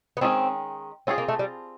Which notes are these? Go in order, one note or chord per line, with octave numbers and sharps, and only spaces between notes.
B3
D#3 G#3 C4 C#4
C4 C#4 F4 G#4
A#3
A3
G3